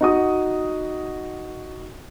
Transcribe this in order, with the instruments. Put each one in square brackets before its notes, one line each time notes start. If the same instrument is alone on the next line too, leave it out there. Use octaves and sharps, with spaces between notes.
[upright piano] D#4 F#4 D#6